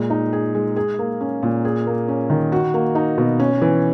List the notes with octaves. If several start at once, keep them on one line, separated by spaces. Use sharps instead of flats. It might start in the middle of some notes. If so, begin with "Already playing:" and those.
Already playing: A#2 G#3
D#4
G#4
G#3
G#4
A#3
C#4
A#2
G#4
A#3
C#4
D#3
F#4
A#3
D#4
B2
C#4
E3